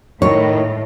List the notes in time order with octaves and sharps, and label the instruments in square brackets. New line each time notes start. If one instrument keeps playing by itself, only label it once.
[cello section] A2 [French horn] D#3 [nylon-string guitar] C#5